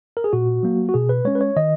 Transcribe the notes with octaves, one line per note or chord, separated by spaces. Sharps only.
A#4
G#4
A#2 F#4
F#3 A#3
F#4
B2 G#4
B4
G#3 C#4 C#5
B4
C#5
D#3 D#5